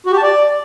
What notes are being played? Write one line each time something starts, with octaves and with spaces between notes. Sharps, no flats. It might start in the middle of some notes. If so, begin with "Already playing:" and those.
F#4
G4
A5
D5